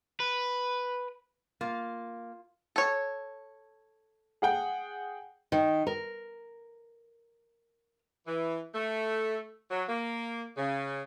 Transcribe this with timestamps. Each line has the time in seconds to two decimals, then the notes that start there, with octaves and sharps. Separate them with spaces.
0.20 B4
1.61 A#3 F4
2.76 A4 C#5
4.42 G#4 F#5 G5
5.52 D#3
5.87 A#4
8.27 E3
8.75 A3
9.71 F#3
9.88 A#3
10.57 C#3